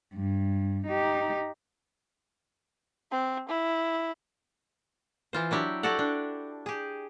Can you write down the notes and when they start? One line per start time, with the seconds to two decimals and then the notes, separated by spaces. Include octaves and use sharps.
0.14 G2
0.87 D#4 G4
3.12 C4
3.49 E4
5.33 E3 F4 C5
5.51 F#3 D4 E4 G4
5.83 F#4 G4 A4 D5 F#5
5.99 D4
6.66 G4 G#4